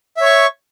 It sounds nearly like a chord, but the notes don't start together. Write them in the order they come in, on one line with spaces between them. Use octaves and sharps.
E5 C#5 C#6